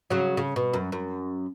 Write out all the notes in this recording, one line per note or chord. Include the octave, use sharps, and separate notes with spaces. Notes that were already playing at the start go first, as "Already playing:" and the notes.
C#3 F#3
C#3
B2
F#2
F#2